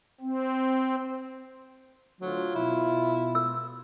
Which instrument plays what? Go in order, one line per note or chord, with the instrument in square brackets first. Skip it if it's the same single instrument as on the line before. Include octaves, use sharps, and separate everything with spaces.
[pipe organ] C4
[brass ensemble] D2 [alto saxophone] F#3 [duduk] F4
[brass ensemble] B2 [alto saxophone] E4
[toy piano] E6